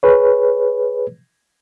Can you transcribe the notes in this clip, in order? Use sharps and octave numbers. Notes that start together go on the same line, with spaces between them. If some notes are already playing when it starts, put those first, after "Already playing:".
G#4 B4 C#5